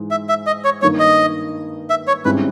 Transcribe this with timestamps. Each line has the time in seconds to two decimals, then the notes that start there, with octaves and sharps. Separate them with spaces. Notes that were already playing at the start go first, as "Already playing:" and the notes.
Already playing: G#2 E3 G#3
0.11 E5
0.29 E5
0.46 D#5
0.64 C#5
0.82 G2 D#3 A#3 D#4 C#5
0.99 D#5
1.90 E5
2.07 C#5
2.25 G#1 G#2 G3 C#4 E4 B4